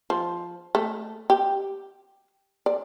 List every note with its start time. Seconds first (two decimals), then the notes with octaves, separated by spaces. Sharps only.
0.10 F3
0.75 A3
1.30 G4
2.66 D5